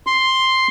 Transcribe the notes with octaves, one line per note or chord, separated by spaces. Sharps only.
C6